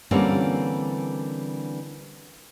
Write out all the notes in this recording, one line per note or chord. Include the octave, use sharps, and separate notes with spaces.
D3 E3 G3 A#3 C4 C#4